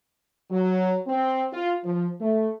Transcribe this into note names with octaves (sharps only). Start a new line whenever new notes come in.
F#3
C4
F4
F3
A3